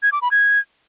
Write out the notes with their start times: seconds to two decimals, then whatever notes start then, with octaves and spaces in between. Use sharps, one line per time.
0.03 G#6
0.12 D6
0.22 B5
0.31 G#6